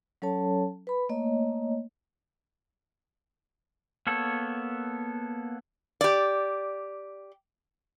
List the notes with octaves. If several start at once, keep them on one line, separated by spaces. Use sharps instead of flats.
F#3 C#4 A4 C#5 A5
B4 B5
A3 A#3 C#5 D#5
A#3 B3 A4 C#5
G4 D5